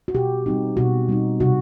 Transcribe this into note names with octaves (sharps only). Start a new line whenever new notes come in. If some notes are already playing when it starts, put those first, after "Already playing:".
F#4
B2 G4
G3 C4 D#4
B2 F#4
G3 C4 D#4
C3 F#4